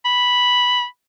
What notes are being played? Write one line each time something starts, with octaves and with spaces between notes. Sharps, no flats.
B5